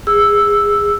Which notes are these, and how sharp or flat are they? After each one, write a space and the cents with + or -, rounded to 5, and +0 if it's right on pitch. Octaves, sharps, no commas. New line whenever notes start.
G#4 -20 E6 +0